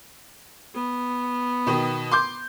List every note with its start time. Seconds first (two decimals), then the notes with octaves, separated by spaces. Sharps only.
0.75 B3
1.67 B2 D#3
2.12 C6 D6 G6